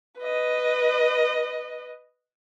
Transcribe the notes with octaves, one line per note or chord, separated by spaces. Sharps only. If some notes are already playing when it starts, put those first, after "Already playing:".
B4 D#5